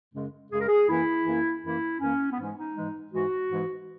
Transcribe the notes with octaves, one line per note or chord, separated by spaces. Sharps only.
F#2 C#3 G#3
F#2 C#3 G#3 G#4
A#4
G#4
F#2 E3 A#3 E4
F#2 E3 A#3
F#2 E3 A#3 E4
F#2 E3 A#3 C#4
B3
G#2 E3 G#3 C#4
D#4
G#2 E3 G#3
G#2 E3 G#3 F#4
G#2 E3 G#3